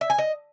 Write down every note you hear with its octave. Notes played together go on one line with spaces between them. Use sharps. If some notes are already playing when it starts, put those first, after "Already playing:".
E5
G#5
D#5